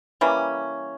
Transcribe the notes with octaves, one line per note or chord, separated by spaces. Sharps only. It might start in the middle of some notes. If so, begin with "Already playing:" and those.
E3 G3 A#3 C#4